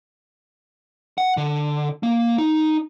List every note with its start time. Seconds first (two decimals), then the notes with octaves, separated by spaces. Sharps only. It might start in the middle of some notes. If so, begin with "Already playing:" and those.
1.18 F#5
1.37 D3
2.03 A#3
2.38 D#4